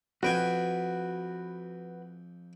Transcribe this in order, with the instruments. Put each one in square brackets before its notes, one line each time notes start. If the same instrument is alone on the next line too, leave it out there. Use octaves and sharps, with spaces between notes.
[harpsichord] F2 G5 G#5 [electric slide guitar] F#4 B4